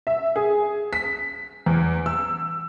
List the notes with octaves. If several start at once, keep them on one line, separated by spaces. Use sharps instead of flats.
E5
G#4
B6
E2
E6